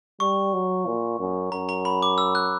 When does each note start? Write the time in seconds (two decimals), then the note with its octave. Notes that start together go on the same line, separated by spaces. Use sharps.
0.20 G3 C#6
0.53 F#3
0.86 A#2
1.20 F#2
1.52 F#2 A#5
1.69 A#5
1.85 B5
2.02 D6
2.18 E6
2.35 F#6